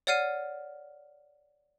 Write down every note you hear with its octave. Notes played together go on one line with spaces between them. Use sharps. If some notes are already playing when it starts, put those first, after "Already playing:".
C#5 D5 F#5 F6 C7 D#7